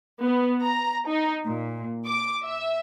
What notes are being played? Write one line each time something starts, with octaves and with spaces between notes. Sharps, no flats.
B3
A#5
D#4
A#2
D6
E5